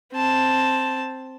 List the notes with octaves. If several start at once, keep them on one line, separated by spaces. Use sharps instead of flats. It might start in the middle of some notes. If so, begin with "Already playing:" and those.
C4 A5